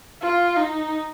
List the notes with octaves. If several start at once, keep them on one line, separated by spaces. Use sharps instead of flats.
F4
D#4